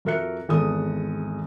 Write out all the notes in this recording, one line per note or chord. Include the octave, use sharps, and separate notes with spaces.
F2 F#4 A#4 E5 F#6 C#7
G#1 E2 A4 D#6